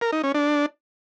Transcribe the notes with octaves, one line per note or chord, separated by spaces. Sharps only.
A#4
D#4
C#4
D4